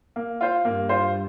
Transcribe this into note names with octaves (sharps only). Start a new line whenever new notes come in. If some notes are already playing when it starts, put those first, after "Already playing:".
A#3
F4 C5
G2 A#3
F4 C5